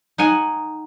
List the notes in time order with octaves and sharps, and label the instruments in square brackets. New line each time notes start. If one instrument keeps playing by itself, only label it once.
[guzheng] D#4 F#5 G#5